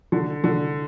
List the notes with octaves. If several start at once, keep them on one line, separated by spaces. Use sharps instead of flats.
D3
D3